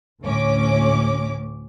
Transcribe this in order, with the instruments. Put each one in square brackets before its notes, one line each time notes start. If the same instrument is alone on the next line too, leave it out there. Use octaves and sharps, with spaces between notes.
[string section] D2 A2 C#4 D6